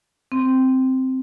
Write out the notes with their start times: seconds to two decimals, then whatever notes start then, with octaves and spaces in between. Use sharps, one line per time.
0.32 C4